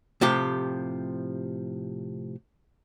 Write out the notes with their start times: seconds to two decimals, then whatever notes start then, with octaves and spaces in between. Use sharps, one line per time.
0.21 A2 C3 F3 G4